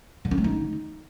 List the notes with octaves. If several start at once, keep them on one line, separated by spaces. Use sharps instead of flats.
D3
C#4
A3
D#4